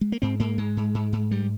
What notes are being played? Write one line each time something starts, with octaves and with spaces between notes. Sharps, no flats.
G#3
A#3
G#2 C4
G#2 A#3
G#2 G#3
G#2
G#2
G#2
G2 G3